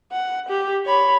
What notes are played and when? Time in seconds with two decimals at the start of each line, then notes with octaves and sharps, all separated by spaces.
0.12 F#5
0.49 G4
0.86 C#5 B5